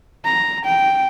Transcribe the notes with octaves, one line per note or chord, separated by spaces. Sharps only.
A#5
G5